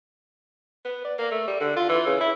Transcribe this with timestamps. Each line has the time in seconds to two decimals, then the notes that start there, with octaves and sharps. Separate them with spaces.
0.85 B3
1.05 D5
1.19 A#3
1.31 A3
1.48 G3
1.61 D3
1.76 F4
1.89 E3
2.06 C#3
2.21 E4